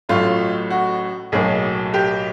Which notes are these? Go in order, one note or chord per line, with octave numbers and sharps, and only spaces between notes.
A1 A2 F#3 A3 F4
F#4
B1 A2 F#3 A#3 G#4
G4